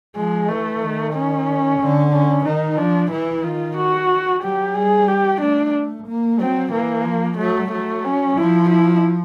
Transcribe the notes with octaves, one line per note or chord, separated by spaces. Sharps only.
F3 G#3
E3 A3
D#3
C#4
D3
C#4
D#3 D#4
F3 D4
E3 E4
D#3 F4
F#4
F#3 G4
G3 G#4
G4
A3 D4
A#3
F#3 C4
E3 A#3
F3
F#3 A3
F#3 A3
C#4
F3 E4
E4